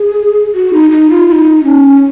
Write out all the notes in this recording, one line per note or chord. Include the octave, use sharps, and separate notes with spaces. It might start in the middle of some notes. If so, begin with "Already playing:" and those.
Already playing: G#4
F#4
D#4
D#4
F4
F4
D#4
C#4